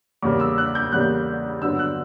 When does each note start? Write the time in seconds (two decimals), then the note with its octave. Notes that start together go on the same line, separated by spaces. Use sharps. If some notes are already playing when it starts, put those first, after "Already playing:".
0.22 E2 C#3 G3 A#3 D6
0.40 E6
0.58 F#6
0.75 G6
0.92 E2 C#3 G3 A#3 F#6
1.61 G2 D3 F#3 B3 E6
1.79 F#6